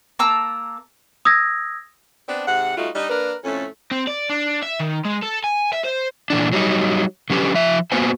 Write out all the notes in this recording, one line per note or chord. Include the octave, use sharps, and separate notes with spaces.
A#3 A5 A#5 E6
D#6 E6 G#6 A#6
B3 C4 D4
G#2 C3 F#5
G3 A3 D#4 F4 F#4
G3 D4 D#4
A#3 D4 A#4 B4
F2 A2 A3 C#4
C4
D5
D4
E5
D#3
G#3
A4
G#5
E5
C5
A#2 E3 D4
F#3 G3 D#4
D3 F#3 C#4 G4 B4
F3 E5
A#3 B3 F#4 B4 C5 G#5